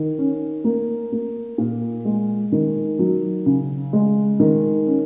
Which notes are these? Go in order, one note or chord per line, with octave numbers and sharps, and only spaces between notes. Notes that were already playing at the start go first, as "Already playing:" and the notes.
Already playing: D#3
C#4
A#3
A#3
A#2
G#3
D#3
F#3
C#3
G#3
D#3
C#4